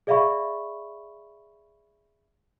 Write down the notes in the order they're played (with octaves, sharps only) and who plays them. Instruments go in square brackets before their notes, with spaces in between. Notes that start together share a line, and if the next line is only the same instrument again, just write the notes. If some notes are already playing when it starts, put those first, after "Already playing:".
[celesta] G#4 D5 E5 F5 B5 C#6